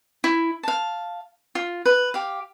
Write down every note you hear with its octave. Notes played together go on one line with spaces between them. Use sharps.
E4
F5 A5
F4
B4
G4 F5